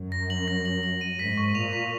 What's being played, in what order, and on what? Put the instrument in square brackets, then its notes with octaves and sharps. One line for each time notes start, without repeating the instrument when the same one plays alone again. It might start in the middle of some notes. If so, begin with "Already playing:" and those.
Already playing: [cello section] F#2
[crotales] A#6
F#7
A#6
F#7
F#7
D#7
[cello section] G#2 [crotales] B6
[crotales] C#6
[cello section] A#2 [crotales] F7
[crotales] B6